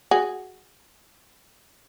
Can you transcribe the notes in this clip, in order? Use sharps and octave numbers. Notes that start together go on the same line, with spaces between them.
F#4 G#4